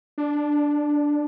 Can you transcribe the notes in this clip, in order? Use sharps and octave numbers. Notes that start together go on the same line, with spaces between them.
D4